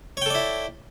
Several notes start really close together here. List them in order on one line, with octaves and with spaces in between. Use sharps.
C#5 G5 A4 D5 E4